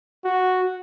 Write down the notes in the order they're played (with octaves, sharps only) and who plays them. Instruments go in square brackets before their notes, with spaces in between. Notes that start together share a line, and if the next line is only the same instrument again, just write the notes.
[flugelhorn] F#4